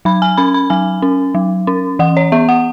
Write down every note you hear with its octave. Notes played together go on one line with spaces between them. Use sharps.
F#3 B5
G#5
C#4 B5
B5
F#3 G#5
C#4
F#3
C#4
E3 F#5
C#5
B3 E5
F#5